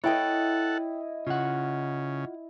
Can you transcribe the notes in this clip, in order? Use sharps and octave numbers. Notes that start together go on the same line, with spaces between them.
E4 A4 C#5 D#5 F#5 G5
C#3 F4 F#5